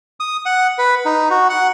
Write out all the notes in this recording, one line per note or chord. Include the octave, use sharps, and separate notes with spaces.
D#6
F#5
B4
D#4
F#4
F#5